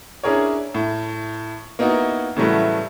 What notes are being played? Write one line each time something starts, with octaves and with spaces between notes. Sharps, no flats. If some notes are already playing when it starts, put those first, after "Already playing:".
C#4 D4 E4 G#4 A#4 C#5
A2
A#3 B3 D#4 E4 F#4
A2 C#3 E3 F#3 G3 A3